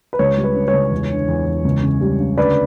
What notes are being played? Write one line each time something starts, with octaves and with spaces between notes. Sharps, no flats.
B4
C#2 C#5
G3
B4
C#3
C#5
C#2
E2
D3
E2
E2
C#2
C#3
G3
C#3
D2 B4 D5